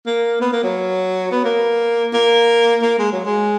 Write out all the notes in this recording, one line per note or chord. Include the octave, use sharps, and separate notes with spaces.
A#3
B3
A#3
F#3
B3
A#3
A#3
A#3
G#3
F#3
G#3